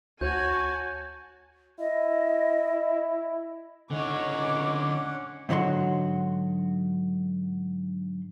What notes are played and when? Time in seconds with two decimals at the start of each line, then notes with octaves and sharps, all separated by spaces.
0.21 D2 F#4 C#5 G#5 A5 G6
1.79 E4 D#5
3.91 C#2 D3 C#4 D#4 C#5 F#5 D6
5.49 G#2 D3 F#3 F#4 C6